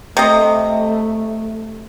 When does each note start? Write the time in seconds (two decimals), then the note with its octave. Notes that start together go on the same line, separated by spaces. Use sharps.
0.17 C3 A3 D#5